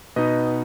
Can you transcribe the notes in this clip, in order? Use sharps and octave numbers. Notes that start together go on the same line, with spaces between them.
B2 B3 D#4 B4 D#5